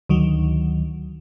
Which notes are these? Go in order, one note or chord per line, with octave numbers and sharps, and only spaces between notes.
D2 D#3 F#3